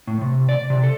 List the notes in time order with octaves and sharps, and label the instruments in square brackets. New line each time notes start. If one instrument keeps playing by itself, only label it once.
[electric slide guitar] A2
C3
D5
C3
A4